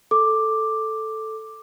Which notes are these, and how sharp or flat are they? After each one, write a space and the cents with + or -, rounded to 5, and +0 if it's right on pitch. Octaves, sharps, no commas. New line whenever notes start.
A4 +0 D6 +5